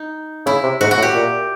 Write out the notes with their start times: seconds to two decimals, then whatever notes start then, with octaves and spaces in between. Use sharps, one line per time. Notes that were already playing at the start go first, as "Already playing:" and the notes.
Already playing: D#4
0.46 C#3 E4
0.63 C3
0.80 G#2 F#4
0.91 F#4
0.97 A2
1.02 G4
1.14 A#2